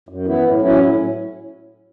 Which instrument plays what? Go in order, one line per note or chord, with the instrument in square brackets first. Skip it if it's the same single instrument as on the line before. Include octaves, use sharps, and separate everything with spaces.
[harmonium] F#2
E3 B3 E4
A2
F#3 C#4 E4
A2